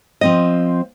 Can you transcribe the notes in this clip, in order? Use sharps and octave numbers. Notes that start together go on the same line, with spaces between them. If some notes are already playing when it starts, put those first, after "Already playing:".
F3 C4 D#5